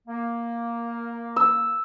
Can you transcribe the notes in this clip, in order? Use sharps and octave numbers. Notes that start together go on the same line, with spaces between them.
A#3
E6